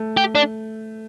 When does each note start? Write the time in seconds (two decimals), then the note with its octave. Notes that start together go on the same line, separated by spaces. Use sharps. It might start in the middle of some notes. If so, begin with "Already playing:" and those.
Already playing: A3
0.17 G4
0.35 D4